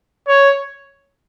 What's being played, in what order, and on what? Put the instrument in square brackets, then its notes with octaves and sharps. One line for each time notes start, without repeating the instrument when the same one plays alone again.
[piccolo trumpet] C#5